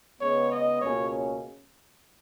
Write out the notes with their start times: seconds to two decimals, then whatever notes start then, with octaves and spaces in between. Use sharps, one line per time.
0.21 C#3 G#3 B3 C#5
0.51 D#5
0.81 C#2 B2 A#3 C#4 G#4 C#5